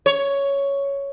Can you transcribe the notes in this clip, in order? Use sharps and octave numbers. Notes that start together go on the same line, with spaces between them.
C#5